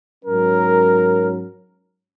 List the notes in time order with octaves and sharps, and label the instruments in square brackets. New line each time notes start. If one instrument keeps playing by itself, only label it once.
[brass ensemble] G#2 F#3 C#4 A#4